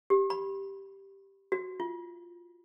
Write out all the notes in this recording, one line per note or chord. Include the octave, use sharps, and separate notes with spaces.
G4
B5
F#4
F4